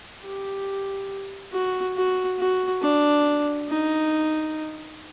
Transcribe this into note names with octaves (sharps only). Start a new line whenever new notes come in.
G4
F#4
F#4
F#4
D4
D#4